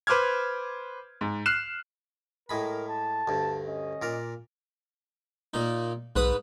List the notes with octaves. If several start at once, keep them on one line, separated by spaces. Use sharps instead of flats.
B4 C5 D6 F6 G#6
G#2
F6 F#6 C7 E7
A2 G#3 A#4 B5
A5
D2 G2
C#4 D#5
A#2 A#4 D5
A#2 D#4
B1 G#2 B4 D#6